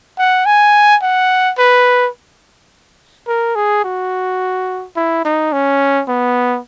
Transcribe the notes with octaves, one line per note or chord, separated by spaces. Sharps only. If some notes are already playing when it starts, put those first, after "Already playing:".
F#5
G#5
F#5
B4
A#4
G#4
F#4
E4
D#4
C#4
B3